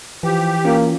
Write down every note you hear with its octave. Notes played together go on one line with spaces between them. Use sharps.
E3 F3 G4
A#3 C#4 F4